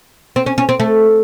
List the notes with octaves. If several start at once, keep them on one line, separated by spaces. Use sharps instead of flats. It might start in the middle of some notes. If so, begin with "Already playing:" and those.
C4
C#4
C#4
C4
A3